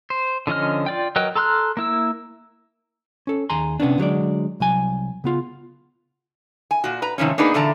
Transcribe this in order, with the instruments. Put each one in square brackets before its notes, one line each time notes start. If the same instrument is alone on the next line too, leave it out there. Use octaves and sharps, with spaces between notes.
[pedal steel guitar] C5
D3 F3 C#4 D#5 F6
F4 D5 G5
F#3 A#4 B4 D#5 G5
A4 A#5 C6 F6 F#6
A#3 E4 E6
[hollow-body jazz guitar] C#4 A4
D#2 G#4 G#5 A#5 C6
C3 B3 C#4 D4
D3 F#3 G#3 D5
C2 F#3 G#5
C#3 B3 F4
[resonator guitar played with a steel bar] G#5
A#2 F#4
B4 A#5
G#2 C3 D#3 F3 C#4
A#3 B3 D4 D#4 G#4 B4
A#2 D3 E3 D5 A5 A#5